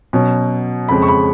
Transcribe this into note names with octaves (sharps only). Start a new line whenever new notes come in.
B2 F#3 C#4
F2 C#3 G#3 B5
C#6
B5